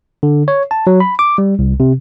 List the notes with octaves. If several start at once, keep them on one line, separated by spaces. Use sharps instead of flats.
D3
C#5
A5
F#3
B5
D6
G3
C2
C3